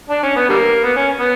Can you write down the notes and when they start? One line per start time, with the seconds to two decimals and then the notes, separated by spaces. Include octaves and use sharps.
0.10 D4
0.23 C#4
0.36 B3
0.50 D3 G3 A#3
0.84 B3
0.97 C#4
1.20 B3